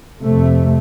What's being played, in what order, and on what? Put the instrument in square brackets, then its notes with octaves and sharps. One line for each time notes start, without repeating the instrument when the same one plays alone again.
[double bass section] F2 C3 A3